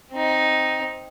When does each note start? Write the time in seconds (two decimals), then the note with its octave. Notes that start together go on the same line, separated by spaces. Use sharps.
0.12 C4 D#4